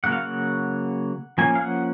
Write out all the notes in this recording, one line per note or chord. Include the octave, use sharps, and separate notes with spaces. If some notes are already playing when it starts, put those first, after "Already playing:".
C#3 F#3 A#3 F#5
F5
F#5
F3 A#3 C#4 G#5
F5
F#5